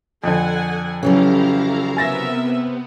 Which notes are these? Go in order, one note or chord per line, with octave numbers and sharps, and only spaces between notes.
F2 D3 A4 F#5 G#5
C#3 E3 F#3 E4 G4 A4 F5 A#5
C3 B3 A#4 E5 G#5 A6 A#6